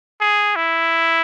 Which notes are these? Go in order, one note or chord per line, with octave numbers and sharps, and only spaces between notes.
G#4
E4